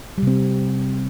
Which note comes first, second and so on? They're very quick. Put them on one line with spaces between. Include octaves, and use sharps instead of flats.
G3 C3 C4